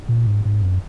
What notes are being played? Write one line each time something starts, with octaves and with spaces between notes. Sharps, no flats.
A#2
G#2
G#2
F#2